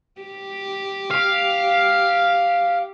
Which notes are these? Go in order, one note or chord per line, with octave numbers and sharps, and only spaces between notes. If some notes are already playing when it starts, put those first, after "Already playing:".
G4
F5